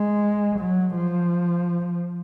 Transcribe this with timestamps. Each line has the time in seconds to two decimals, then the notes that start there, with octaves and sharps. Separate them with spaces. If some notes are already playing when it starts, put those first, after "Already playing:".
Already playing: G#3
0.59 F#3
0.96 F3